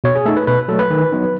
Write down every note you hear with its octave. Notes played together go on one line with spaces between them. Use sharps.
B2 C#5
G#4
A3 D#4 A4
B4
B2 B4
F#3 A3 A4
B4
D#3
F#3 B3 D#4